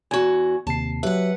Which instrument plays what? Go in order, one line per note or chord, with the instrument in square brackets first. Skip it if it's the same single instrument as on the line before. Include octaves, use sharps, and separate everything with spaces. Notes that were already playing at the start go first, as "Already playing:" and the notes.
[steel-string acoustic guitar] E2 F#4 [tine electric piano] G#5 G#6
[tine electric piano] D#2 C3 C7 [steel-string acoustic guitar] A5
[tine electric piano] F#3 G4 E5 [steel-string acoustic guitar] B4 F#5